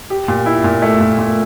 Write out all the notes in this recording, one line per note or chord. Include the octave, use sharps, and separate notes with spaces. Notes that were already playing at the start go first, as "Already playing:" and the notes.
G4
A#2
E4
A#2
A3
A#2
A#2